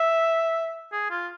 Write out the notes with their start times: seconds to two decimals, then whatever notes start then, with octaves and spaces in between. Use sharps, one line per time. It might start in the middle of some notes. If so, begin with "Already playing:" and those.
Already playing: E5
0.92 G#4
1.11 F4